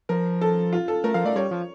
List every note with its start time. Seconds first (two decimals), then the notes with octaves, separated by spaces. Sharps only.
0.09 F3 A#4
0.41 A4
0.73 F4
0.88 A4
1.04 A3 A#4
1.14 F3 F5
1.25 A3 D5
1.35 G3 C#5
1.51 F3